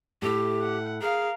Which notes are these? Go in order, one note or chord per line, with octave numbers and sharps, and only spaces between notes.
A2 A3 E4 G4
F#5
G#4 A#4 F5